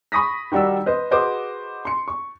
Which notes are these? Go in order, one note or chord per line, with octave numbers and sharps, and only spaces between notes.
B5 C#6 D#6 A#6 B6
D#3 G3 F#4 D5 E6
B4 C5 D#5
F#4 G#4 B4 C5 D#5 D6
C6 C#7
C#6